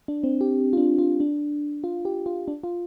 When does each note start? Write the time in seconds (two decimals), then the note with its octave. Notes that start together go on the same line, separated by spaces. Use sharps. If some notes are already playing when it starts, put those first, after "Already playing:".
0.08 D4
0.24 C4
0.41 G4
0.73 F4
0.77 D4
0.98 F4
1.20 D4
1.84 F4
2.05 G4
2.26 F4
2.48 D4
2.63 F4